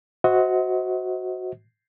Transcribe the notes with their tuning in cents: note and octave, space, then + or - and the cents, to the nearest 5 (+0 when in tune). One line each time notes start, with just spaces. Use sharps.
F#4 +0 C5 -10 D#5 +40